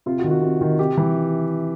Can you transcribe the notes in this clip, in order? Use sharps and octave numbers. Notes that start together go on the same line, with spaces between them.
C3 F4
F#4
D#3
F#4
C3
D#3
C3 G4
E3